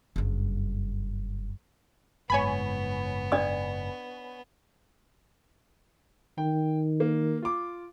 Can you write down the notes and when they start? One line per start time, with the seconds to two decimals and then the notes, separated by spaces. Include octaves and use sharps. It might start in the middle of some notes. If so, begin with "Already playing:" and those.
0.16 F#1 G2
2.30 F#1 G#2 B3 C#5 G#5 B5
3.32 D4 D5 D#6
6.38 D#3 G5
7.00 A#3
7.43 F4 D6